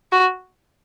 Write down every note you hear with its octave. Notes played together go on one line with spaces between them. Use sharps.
F#4